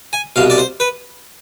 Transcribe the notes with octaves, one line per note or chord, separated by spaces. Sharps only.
G#5
C2 B2 F5
D5
C5
B4